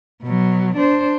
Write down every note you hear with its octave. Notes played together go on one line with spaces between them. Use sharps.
B2 F#3
D4 C5